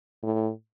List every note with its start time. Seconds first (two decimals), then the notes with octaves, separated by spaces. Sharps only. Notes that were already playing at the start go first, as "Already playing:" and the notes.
0.23 A2